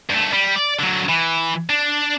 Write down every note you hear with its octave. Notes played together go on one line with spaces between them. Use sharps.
G2 A3
G3
D5
D3 F#3
E3
D4